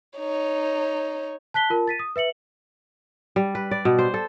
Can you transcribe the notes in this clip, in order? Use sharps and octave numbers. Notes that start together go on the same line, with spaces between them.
D#4 C#5
A5 F#6 B6 G7
F4 A#4 A5
A6 B6 D#7
D#6
B4 E5 C#7 F#7
G3
B4
D5
B2
C5
A4